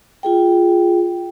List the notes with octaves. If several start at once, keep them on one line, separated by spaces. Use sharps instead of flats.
F4 G#4 G5